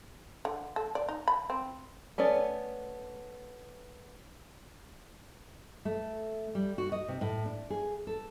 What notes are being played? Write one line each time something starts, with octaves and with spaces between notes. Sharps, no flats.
D3
A4
D5
D#4
B5
C4
A3 B3 C#4 D5
A3
G3
F#4
D#5
C3
A2
D4
G#4
A4